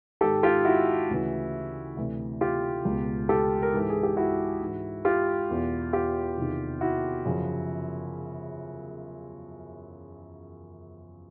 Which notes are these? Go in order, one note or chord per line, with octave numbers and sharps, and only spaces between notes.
G#2 D#3 G4 A4
F4 G4
E4 F#4
D2 C#3 E3
D2 C3 E3
F4 G4
C#2 B2
G4 A4
A#4
G#2 E3 A4
G#4
G4
E4 F#4
G#2 E3
F4 G4
E2 B2
F4 G4
E2 C3 D#3
E4 F#4
F#2 C#3 F3